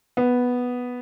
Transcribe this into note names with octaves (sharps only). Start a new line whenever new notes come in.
B3